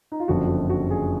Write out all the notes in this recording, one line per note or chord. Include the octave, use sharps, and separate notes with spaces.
D#4
F4
F#1 F2 D3 F3 F#4
F#4
F#4
G#4